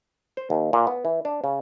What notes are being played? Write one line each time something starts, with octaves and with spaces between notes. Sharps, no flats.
C5
D#2
A#2
B3
E3
D4
C#3